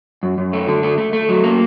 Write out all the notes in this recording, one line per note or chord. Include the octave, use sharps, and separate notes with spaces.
F#2
F#2
A3
D3
A3
A3
A3
F#3
A#3